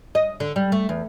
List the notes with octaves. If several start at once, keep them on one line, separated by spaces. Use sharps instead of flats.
D#5
D3
G3
A3
E2